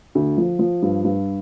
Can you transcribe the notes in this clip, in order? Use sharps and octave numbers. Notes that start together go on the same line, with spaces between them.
D2
F3
F3
G2
G2